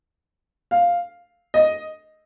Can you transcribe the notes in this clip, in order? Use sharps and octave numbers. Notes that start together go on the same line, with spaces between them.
F5
D#5